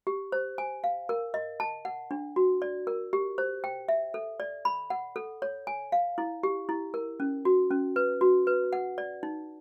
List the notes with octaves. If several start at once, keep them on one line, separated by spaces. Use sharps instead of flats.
G4
C5
G#5
F5
A#4
D#5
A5
F#5
D4
F#4
D5
A#4
G4
C5
G5
E5
A4
D5
B5
F#5
A4
C#5
G#5
F5
E4
G4
E4
A#4
C#4
F#4
C#4
B4
F#4
B4
F#5
D5
D#4